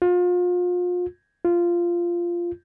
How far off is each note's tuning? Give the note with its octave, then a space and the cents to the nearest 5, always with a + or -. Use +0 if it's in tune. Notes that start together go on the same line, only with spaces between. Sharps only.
F4 +35
F4 -10